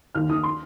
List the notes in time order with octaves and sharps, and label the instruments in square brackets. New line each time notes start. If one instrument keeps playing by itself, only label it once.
[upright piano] D#2 F6
D#2 D#6
C6